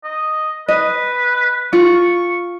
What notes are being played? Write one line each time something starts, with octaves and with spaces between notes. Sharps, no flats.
D#5
B4 D#5
F4 C#6